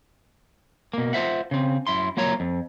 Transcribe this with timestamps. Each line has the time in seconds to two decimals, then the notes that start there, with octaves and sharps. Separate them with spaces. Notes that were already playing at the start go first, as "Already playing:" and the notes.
0.93 B2 A#3
1.13 F4 C5 E5 F#5
1.51 C#3 C4
1.87 F#2 E4 C6
2.17 F#3 A#3 F4 C#5 A#5
2.40 F2